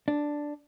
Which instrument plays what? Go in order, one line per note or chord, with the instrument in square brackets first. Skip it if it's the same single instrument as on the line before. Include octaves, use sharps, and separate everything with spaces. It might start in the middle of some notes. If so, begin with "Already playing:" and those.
[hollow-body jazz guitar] D4